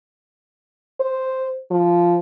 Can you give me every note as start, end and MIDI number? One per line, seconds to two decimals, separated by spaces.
1.00 1.56 72
1.71 2.19 53